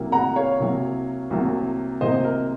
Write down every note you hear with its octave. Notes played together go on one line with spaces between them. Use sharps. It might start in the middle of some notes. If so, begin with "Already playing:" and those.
Already playing: C2 C3 F#3 A#3
F#5 A#5
C#5 F5
C2 C3 F#3 A#3
C2 C3 F#3 A#3
C2 C3 F#3 A#3 C5 D#5
A#4